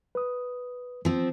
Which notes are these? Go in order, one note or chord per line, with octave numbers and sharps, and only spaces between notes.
B4 D#6
F3 C4